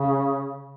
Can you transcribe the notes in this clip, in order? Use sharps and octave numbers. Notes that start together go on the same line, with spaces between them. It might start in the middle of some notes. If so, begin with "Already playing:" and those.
Already playing: C#3